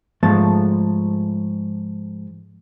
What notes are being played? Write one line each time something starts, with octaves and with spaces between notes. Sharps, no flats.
G#2 F3 A3 A5